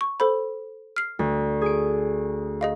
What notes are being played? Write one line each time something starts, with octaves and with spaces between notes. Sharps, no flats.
C#6
A4 C5 B5
F6 C7
D2
G#4 D7
G#4 D#5 F5